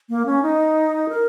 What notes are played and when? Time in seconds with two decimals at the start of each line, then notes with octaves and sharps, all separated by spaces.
0.09 A#3
0.26 C#4
0.42 D#4
1.09 A#4